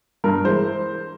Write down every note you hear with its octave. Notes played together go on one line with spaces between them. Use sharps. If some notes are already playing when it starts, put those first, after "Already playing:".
G2 A#4
E3 G#3 C5